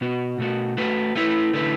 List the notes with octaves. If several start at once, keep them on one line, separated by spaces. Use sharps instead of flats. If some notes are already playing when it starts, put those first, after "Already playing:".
B2 B3 F#4
B2 A3 F#4
A3 F#4 B4
A3 E4 B4
D3 A3 E4 B4